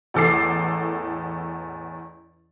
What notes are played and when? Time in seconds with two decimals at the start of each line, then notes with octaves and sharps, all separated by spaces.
0.14 A1 E2 A4 D6 C7